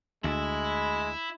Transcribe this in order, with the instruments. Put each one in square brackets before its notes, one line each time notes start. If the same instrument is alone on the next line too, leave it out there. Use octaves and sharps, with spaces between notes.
[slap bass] D2 [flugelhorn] G#3 [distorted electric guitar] E4 E5